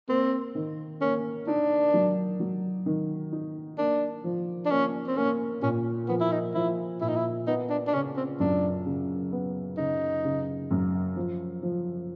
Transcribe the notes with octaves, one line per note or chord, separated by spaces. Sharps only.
A#3 C4
D#3
A#3 C#4
D4 D#4
F#3
F#3
D#3
D#4
A#3 D4
F3
D4
A#3 C#4
C4
A#3 C#4
A#2 C#4
F3 B3
E4
D#4
F3 E4
A#2 E4
D#4
E4
B3 D#4
D4
D4
C#3 C#4
C4
F#2 D4
C#3
B3
C#3 D#4
C#3
F#2
F3
F3